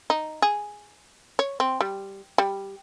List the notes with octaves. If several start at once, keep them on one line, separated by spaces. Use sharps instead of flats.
D#4
G#4
C#5
C4
G3
G3